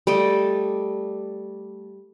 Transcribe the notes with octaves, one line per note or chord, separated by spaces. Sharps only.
G3 A3 D5 D#5